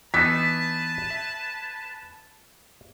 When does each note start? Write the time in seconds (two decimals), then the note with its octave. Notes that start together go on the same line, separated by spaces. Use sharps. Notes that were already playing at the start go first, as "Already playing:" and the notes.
0.14 E3 B3 D#4 B4 G#5 A5 B6
1.10 E5